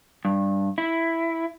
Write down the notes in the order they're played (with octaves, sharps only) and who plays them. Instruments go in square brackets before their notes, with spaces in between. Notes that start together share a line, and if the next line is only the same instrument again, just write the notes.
[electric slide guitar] G2
E4